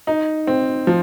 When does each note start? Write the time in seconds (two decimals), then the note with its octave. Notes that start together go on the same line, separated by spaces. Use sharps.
0.07 D#4
0.47 C4
0.87 F3